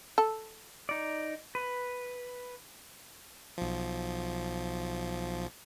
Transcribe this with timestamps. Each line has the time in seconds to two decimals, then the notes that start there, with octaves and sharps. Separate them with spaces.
0.18 A4
0.89 D#4 D5
1.55 B4
3.58 B1 F3